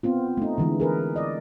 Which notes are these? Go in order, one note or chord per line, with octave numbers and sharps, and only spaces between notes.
B3 C4 F4
A3 D#4
D3 E3 G#3
G#4 A#4 B4
D5 D#5